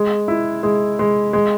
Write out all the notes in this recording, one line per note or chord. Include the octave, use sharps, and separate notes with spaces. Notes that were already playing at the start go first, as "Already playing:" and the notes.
Already playing: G#3
E4
G#3
G#3
G#3